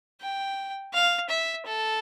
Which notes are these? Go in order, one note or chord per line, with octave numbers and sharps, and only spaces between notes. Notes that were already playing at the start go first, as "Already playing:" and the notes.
G5
F5
E5
A4